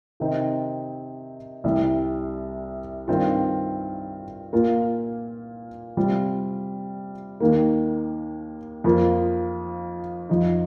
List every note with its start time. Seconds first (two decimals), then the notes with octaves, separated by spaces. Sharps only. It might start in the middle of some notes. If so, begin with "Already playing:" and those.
0.20 C3 D#3 C4 D#4
1.64 C2 C3 G3
3.08 G2 D#3 C4 F4
4.53 A#2 A#3 F4
5.97 C3 G3 C4 F4
7.40 D#2 D#3 A#3
8.84 F2 F3 A#3 F4
10.29 F2 F3 D#4